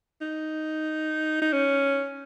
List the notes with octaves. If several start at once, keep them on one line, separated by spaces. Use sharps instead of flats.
D#4
D#4
C#4